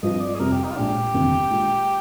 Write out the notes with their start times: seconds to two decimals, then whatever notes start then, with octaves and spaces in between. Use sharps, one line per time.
0.03 G2 F3 C4 D#5
0.21 D5
0.35 G#4
0.39 F2 C3 G3 A#4
0.52 G4
0.64 D#4
0.71 F4
0.76 A#1 A#2 G#3 D4 G4
1.14 G1 F2 C3 D#3 A#3
1.50 A#2 G#3 D4 F4